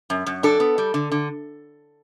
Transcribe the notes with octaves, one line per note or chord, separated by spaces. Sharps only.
F#2
F#2
D4 A4
B3
G3
D3
D3